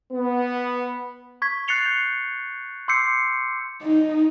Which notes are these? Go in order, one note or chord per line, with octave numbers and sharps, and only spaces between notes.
B3
C#6 G#6 B6
F#6 A6 C7 C#7 F7 G7
G6
C6 D6 E6 G6 C7 C#7
D#4